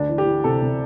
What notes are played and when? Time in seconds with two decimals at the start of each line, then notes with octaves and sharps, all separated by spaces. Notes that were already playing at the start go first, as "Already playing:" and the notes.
Already playing: D2 D4
0.09 E3
0.18 G4
0.26 E3
0.44 C3 A4
0.62 C3